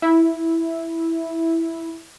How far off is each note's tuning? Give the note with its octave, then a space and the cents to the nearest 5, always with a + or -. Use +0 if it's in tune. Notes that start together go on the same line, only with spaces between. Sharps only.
E4 +0